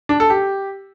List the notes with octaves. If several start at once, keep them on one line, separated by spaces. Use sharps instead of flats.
D4
A4
G4